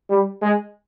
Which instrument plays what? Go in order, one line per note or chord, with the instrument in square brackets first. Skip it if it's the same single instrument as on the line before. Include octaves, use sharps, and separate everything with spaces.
[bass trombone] G3
G#3